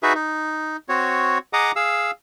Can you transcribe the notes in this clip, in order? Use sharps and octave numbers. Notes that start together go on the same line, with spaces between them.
D#4 F#4 G#4 B4 E5
D#4
C4 F#4 C#5
G#4 D#5 F#5 A#5 D6 D#6
G#4 F5 E6